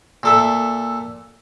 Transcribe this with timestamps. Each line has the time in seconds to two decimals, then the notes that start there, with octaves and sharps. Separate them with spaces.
0.23 A#2 A4 E5